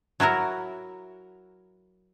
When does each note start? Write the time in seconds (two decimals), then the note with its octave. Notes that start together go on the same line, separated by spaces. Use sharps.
0.20 F#3 E4 F#4 A#4